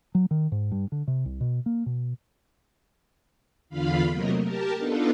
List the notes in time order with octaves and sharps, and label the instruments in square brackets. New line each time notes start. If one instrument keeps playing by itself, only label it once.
[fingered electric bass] F#3
D#3
G#2
G2
D3
C3
C2
B2
A#3
B2
[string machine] E2 D3 F4 F5 B5
C3 F#3 A3 A#3 A#4 D#5
G4 A#4 A5
B3 D4 D#4 F4 A4